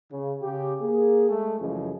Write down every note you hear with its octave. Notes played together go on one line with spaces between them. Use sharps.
C#3
C#3 C#4 G4
A#3 G#4
G#3 A3
F#2 C#3 E3 F3 G#3